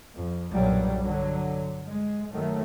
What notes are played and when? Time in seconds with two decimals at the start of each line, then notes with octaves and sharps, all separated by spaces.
0.15 F2
0.51 B1 G2 A#2 F#3 G3
1.03 D3 F#3
1.87 G#3
2.32 F#2 D#3 F#3 A3